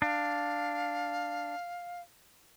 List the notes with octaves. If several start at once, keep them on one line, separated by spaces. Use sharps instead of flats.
D4 F5